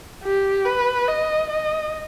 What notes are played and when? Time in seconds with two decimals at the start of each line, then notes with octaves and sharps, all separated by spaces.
0.24 G4
0.66 B4
1.08 D#5
1.50 D#5